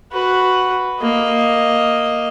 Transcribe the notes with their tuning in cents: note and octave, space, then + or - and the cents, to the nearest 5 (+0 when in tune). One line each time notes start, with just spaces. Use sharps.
F#4 +0 B4 +5
A#3 +0 D#5 +0